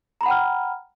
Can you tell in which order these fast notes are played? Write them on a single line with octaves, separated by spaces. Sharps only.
A#5 B5 F#5 G5 F6